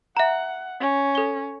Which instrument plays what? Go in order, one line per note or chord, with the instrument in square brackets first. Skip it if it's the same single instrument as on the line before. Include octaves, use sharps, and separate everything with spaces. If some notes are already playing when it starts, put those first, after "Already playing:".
[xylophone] E5 A#5 [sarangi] F#5
[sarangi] C#4
[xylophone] A4 G7